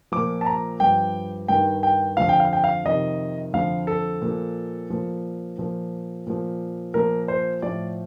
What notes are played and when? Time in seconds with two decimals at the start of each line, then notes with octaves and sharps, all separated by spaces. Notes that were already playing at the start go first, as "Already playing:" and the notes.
0.12 A#2 F3 D6
0.41 A5
0.46 A#5
0.80 G2 F3 G5
1.48 G2 D#3 G5
1.83 G5
2.17 F2 D3 F3 F5
2.29 G5
2.40 F5
2.53 G5
2.64 F5
2.85 F2 C3 D#3 D#5
3.53 F2 D3 F3 F5
3.87 A4
4.22 A#2 F3
4.90 A#2 F3
5.58 A#2 F3
6.27 A#2 F3
6.94 A#2 F3 A#4
7.28 C5
7.62 A2 F3 D5